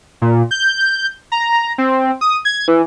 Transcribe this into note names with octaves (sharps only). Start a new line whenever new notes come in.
A#2
G6
A#5
C4
D#6
G#6
E3